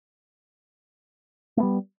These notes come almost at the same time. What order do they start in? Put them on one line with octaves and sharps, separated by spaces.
A3 B3 G3